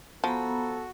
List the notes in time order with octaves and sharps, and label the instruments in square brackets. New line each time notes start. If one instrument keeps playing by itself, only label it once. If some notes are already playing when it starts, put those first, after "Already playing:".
[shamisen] F3 [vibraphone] B3 A#5 B5 [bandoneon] F#4 [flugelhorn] A4